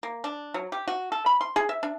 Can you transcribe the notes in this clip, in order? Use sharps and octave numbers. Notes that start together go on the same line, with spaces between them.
A#3
D4
F#3
G4
F#4
A4
B5
C6
G#4
E5
D4